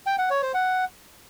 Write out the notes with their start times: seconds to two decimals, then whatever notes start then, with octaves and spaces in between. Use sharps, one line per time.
0.06 G5
0.18 F#5
0.30 C#5
0.42 C5
0.54 F#5